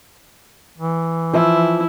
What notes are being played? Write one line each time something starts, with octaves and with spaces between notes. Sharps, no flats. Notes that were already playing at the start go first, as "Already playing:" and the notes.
E3
F3 E4 E5